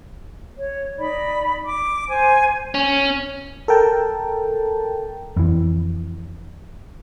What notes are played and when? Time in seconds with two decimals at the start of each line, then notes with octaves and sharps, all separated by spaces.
0.57 C#5
0.98 D#4 D5 B5
1.66 D6
2.09 C5 G#5
2.74 C#4
3.68 A4 A#4 G5 A5
5.37 F2 E3